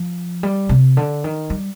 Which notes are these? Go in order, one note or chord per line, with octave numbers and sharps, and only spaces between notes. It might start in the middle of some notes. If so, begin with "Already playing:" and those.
Already playing: F3
G3
C3
D3
D#3
G3